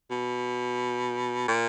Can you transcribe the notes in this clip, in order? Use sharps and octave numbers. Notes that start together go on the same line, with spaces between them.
B2
A#2